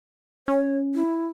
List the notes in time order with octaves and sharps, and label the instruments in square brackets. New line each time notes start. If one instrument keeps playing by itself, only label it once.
[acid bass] C#4 [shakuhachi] C#5
[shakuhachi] E4